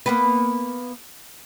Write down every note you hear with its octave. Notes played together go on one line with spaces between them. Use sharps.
A#3 B3 B4